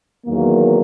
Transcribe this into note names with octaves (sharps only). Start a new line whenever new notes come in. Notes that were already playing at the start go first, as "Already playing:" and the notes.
E2 D#3 F#3 A#3